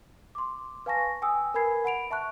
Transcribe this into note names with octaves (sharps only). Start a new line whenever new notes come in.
C6 D6
B4 F5 G#5 A5 C#6 A#6
G5 G#5 D#6 E6
A#4 B4 G#5 B5 G#6 C7
F#5 B5 D7 F7
E5 A5 C#6 F#6